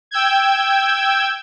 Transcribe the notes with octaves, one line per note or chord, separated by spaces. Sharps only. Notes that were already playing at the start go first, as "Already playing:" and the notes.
G5 E6 G6 G#6